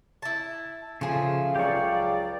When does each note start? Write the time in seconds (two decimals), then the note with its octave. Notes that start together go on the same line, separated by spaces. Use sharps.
0.22 E4 A5
1.01 C#3 F3 A3 G#4 F5
1.56 C#2 F#3 G4 D5 C#6